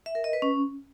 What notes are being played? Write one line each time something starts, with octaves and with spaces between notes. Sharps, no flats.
E5
A#4
D#5
B4
C#4